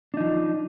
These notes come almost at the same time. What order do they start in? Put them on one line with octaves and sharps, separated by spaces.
D4 D#4 F3